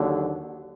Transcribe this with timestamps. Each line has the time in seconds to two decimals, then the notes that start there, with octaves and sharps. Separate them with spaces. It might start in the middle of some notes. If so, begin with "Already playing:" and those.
Already playing: D#2 D3 F#3